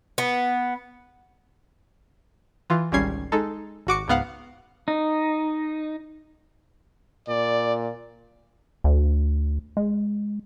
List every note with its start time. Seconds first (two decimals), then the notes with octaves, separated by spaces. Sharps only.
0.18 B3
2.70 E3 F4
2.92 G#1 C#2 G3 C#4 G#6 C7
3.32 G#3 D#4 A4
3.87 G#1 F#4 D6 C#7
4.08 C#2 G#2 B3 F5 F#5
4.88 D#4
7.28 A#2 D5
8.84 D2
9.77 G#3